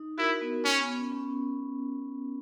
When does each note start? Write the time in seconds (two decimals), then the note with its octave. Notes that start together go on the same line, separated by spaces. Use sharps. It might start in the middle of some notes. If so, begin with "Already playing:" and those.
Already playing: D#4
0.18 E4 F#4 A#4
0.41 B3
0.65 C#4
0.77 B3
0.88 B3
0.99 C#4
1.12 C#4